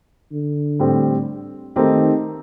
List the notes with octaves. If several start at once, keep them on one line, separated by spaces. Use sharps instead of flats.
D3
A2 G3 C4
D#3 A3 C4 D#4 G4 A#4